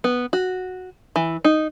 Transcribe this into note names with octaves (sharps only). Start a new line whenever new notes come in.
B3
F#4
E3
D#4